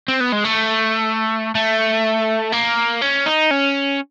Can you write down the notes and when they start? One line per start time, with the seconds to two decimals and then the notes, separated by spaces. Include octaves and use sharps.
0.08 C4
0.20 B3
0.33 G#3
0.45 A3
1.55 A3
2.52 A#3
3.01 C#4
3.26 D#4
3.51 C#4